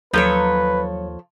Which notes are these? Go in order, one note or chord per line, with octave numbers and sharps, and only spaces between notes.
D#2 F3 F#3 A4 B4 C#5